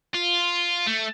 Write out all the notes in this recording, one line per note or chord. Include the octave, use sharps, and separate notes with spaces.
F4
A3